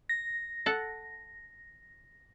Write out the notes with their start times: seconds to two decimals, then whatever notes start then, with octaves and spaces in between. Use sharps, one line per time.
0.09 A#6
0.66 A4 F#5